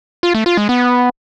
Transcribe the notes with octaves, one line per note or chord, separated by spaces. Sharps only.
F4
A3
F4
G#3
B3